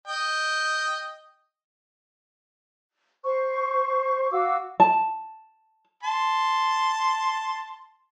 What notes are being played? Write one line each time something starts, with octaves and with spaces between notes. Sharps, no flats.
D#5 G5
C5 C#6
F#4 F5 D6 E6
A5
A5 C6